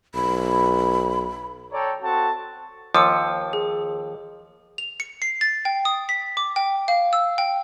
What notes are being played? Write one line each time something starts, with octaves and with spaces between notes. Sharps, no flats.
B1 B5
A4 C#5 D5 G5 A#5
C4 F#4 A4 A5
D#2 F3 D6 E6 C#7
G#4
F7
C#7
C7
A6
G5
D#6
B6
D6
G5
F5
E6
G5